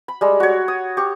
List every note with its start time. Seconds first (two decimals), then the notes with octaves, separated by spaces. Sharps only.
0.08 B5
0.21 G3 G#3
0.40 F#4 C#5
0.68 D#6
0.97 G4 C#6